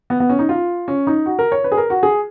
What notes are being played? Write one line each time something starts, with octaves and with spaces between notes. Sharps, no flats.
B3
B3
C#4
D#4
F4
C#4
D#4
F#4
A#4
C#5
B4
G#4
A#4
F#4
G#4